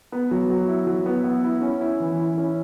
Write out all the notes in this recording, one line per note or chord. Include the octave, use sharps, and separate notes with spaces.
B3
F#3
F#3
E4
F#3
B3
B3
E4
C#4
E4
E3
E4
C#4